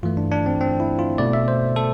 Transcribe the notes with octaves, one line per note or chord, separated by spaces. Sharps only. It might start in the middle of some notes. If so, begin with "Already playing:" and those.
G2 E3 A3 F4
D4
D4
C4
C4
E4
F4
B2 A3 D5
E5
C5
A4